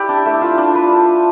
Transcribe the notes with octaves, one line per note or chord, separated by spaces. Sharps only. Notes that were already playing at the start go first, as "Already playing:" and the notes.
Already playing: E4 G4 B4 D5
D4
A3
F4
D4
B4